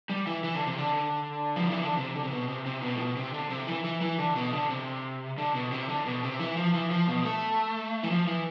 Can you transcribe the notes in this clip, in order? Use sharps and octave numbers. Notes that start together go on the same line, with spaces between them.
G3
E3
E3
D3
C3
D3
F3
E3
D3
C3
D3
C3
B2
C3
C3
B2
A2
B2
C3
D3
C3
E3
E3
E3
D3
B2
D3
C3
D3
B2
C3
D3
B2
C3
E3
F3
E3
F3
B2
A3
E3
F3
E3